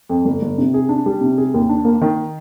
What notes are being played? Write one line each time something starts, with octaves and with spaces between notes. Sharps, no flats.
F2
G1
G1
C3
G#4
D4
G3
C3
G#4
D#2
D4
A#3
D#3